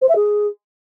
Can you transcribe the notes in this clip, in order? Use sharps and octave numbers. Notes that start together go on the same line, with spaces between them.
C5
E5
G#4